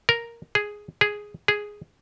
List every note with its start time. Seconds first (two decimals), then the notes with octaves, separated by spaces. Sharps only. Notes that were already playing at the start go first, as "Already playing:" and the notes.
0.09 A#4
0.55 G#4
1.01 G#4
1.48 G#4